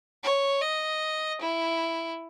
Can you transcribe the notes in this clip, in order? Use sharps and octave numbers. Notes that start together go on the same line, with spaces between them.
C#5
D#5
E4